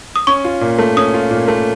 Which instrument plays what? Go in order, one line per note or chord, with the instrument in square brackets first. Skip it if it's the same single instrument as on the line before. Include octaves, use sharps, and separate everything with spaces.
[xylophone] D#6
[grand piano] C#4 [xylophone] C#6
[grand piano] F4
A#2
A3
[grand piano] C#4 [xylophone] D#6
[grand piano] F4
A#2
A3